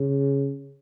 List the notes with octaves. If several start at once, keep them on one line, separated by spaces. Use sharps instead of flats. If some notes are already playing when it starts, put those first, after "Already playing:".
Already playing: C#3